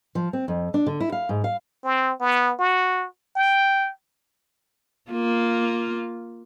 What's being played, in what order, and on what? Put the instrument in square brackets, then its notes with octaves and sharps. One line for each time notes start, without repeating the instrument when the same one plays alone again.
[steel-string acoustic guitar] F3
C4
F2
D4
D3
E4
F5
G#2
F5
[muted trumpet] C4
B3
F#4
G5
[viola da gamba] A#3 F4